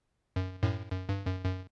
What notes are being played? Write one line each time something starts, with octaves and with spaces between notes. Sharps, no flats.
F#2
F#2 A2
F#2
G2
F#2
F#2